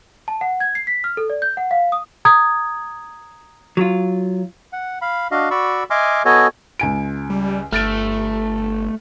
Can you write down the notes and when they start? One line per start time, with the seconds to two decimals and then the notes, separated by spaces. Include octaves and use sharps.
0.28 A5
0.41 F#5
0.60 G#6
0.75 C7
0.87 B6
1.04 F6
1.17 A4
1.30 D5
1.42 G6
1.57 F#5
1.71 F5
1.92 D#6
2.25 A#5 D#6 G#6
3.77 F#3 F4
4.73 F#5
5.02 F5 B5
5.31 D4 F#4 D#5 F5
5.51 F#4 D5 B5 C#6 E6
5.90 D#5 E5 G#5 C6 D6 F6
6.25 B3 F#4 A4 C#5 D#5 G#5
6.79 C#2 G#5 D7
7.30 G3
7.73 G1 A3 F6 A6 D7